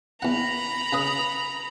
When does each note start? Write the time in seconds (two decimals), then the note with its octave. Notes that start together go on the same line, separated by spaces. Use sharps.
0.22 E2 F#5 A#5 B5
0.92 C#3 B4 D#6